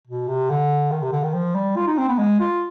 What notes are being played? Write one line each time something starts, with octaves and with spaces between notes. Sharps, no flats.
B2
C3
D3
D#3
C3
D3
D#3
F3
G3
F4
D#4
C4
B3
G#3
F4